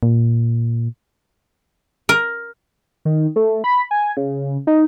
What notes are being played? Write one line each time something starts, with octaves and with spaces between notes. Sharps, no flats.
A#2
A#4
D#3
A3
B5
G#5
C#3
D#4